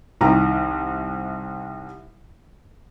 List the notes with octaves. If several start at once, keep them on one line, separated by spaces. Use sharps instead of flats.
C2 C3 D#3 G4 A#5